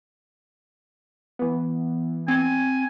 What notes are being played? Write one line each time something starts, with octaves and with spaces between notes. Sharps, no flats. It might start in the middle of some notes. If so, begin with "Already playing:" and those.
E3 B3
C4 G#5